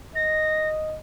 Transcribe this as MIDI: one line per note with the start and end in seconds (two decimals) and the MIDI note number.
0.15 0.98 75
0.15 0.69 94